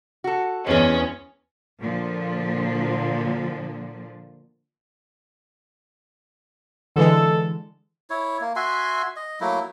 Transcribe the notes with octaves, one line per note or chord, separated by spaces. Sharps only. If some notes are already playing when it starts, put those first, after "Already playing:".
F#4 A4
E2 G#3 C#4 G#4
A#2 D3 F3
D3 E3 G#3 A4
E4 C#5
A#3
F#4 E5 G#5 C6
D#5
F#3 A3 A#3 E4